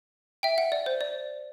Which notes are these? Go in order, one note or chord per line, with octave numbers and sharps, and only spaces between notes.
E5 G5
F#5
D5
C5
D5